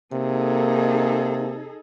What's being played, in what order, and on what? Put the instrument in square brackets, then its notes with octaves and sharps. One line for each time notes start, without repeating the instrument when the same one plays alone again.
[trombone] C3 [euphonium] A#3 [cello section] D#4 G#4 A4